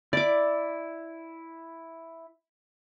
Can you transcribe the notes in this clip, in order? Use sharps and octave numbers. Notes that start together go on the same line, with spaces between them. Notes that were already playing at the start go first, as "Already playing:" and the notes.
E4 D5 D6